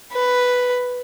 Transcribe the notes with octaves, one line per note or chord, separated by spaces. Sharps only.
B4